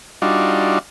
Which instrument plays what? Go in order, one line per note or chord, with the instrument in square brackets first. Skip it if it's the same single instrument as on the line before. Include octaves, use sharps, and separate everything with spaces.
[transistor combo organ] G3 D4 D#4 F4 F#4